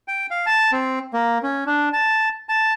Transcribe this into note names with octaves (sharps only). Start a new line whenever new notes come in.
G5
F5
A5
C4
A#3
C#4
D4
A5
A5